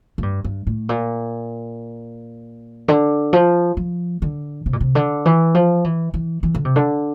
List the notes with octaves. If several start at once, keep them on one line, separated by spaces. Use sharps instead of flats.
A2
G2
G2
A2
A#2
D3
F3
F3
D3
C3
A#2
C3
D3
E3
F3
E3
E3
E3
D3
C3
D3